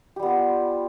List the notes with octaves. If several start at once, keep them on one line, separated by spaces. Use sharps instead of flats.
G3 B3 F4 G4